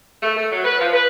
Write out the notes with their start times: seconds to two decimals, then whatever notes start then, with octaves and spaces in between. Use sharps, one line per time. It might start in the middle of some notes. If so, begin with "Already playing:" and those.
0.23 A3
0.37 A3
0.52 F#3
0.64 B4
0.78 F3
0.93 B4